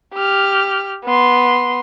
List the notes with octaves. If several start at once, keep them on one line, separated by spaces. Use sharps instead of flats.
G4 F6
B3 C6